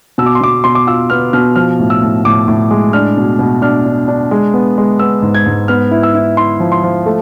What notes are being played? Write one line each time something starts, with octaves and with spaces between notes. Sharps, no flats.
B2 E6
D6
C6
B2 D6
B2 C6
D6
F4 E6
B3 F6
B2 F6
F3 F6
A2
E6
A2
A2 D6
A2
G#3
D4 F6
B2
B2
D4 F6
D4
D4
G#3
B3
G#3
B3 E6
G#2
G#6
G#2
B3 F6
E4
E6
E4
E4 C6
F3
C6
F3
A3